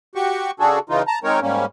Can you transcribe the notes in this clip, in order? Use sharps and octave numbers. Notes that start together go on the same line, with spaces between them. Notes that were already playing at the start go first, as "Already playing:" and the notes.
F#4 G4 C#6
C#3 D4 F#4 G#4 A4
C#3 E3 D#4 F4
A5 A#5
D#3 G#3 C4 D#4 A#4 C#5
G#2 G3 A#3 C#4